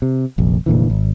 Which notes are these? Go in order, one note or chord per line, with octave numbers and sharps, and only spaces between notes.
C3
F1 A#1
F1 A#2 D3 E3
G#1